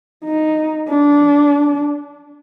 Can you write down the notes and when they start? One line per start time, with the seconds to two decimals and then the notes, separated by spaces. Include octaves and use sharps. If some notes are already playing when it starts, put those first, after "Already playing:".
0.25 D#4
0.89 D4